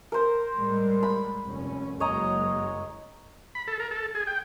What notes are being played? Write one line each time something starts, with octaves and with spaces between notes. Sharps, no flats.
A#4 C5
A2 G3 G#3
B5
F1 D#2 C#4
F#1 F#3 G#3 C#5 D#5 A#5
B5
A4
A#4
A4
G#4
G5